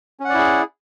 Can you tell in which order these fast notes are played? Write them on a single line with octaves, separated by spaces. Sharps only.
C#4 F#5 D5 E4 G#4